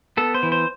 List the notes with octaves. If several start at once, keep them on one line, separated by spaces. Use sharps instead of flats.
B3 A4
C5
E3
C5